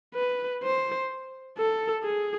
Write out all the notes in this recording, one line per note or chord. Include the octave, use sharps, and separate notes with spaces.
B4
C5
A4
G#4